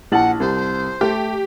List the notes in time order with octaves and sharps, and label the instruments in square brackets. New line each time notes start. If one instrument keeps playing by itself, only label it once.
[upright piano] A#1 A6 F#7 [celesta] E4 A5 [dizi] F#5
[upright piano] C2 [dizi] C5
[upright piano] A3 [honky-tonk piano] G4